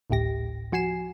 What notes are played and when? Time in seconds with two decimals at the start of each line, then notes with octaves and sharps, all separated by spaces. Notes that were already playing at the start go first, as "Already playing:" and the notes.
0.10 G#1 D2 A2 G4 A#6
0.72 F3 F#4 G#5 C7 E7